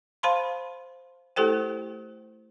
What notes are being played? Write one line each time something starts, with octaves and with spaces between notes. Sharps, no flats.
C5 F5 A5 B5 C6
A3 E4 G4 A4 C5 G5